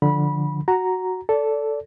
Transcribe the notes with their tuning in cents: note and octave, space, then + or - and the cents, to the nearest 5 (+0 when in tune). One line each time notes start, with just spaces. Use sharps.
D3 +0 F3 +0 B5 -20
F#4 +0 A#5 +0
A4 +0 D5 -25